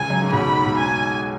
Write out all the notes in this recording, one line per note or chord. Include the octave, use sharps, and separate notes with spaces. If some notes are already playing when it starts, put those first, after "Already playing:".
Already playing: C#2 C#3 G#5
F#2
G#2
B1 B2 B5
B2
G#2 G#5